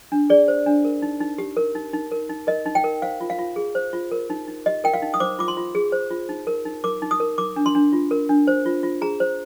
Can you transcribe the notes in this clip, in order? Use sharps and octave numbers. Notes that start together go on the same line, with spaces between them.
D4
G#4 D5
C5
D4
A#4
D#4
D#4
G4
A#4
D#4
D#4
A#4
D#4
A#4 D#5
D#4
G5
A#4
C5 F5
F4
F5
F4
G#4
C5
F4
A#4
D#4
D#4
G4 D#5
A#4 G5
F5
D#4
D#6
C5 D6
F4 D6
C6
F4
G#4
C5
F4
D#4
A#4
D#4
A#4 D6
D#4
D#6
A#4
A#4 D6
D4
C6
D4
F4
A#4
D4
C5
F4
F4
G#4 A#5
C5